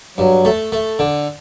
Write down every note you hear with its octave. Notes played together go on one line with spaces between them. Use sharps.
G2 F#3
A3
A3
D3